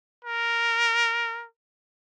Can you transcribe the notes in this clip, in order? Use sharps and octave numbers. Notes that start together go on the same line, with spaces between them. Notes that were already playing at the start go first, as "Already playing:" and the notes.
A#4